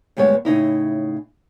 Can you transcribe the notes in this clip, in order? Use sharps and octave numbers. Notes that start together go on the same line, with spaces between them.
D2 G2 G#3 B3 C#5
A2 C#3 D#4 E4